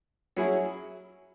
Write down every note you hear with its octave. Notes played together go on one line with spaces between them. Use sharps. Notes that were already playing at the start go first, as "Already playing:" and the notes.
F#3 C#4 E4 G#4